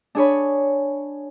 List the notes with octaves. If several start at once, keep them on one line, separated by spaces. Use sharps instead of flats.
D4 G#4 C#5 B5